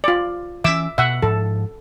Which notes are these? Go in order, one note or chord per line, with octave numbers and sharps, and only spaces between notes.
F4 D5
E3 C#4 E5 D6 E6
B2 E5 F#5
G#2 F3 A4